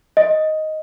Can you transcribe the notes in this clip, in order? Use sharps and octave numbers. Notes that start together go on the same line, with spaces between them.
D#5